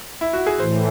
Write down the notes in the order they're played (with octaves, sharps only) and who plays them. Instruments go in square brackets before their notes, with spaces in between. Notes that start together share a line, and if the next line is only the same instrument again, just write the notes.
[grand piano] E4
F#4
G#4
[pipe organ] A2 E3 [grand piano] C5